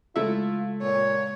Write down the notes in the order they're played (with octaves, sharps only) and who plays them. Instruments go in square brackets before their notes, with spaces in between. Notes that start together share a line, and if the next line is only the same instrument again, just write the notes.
[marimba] C#3 G#3 [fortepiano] A3 E4 E5 [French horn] F4
[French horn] A#2 [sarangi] C#5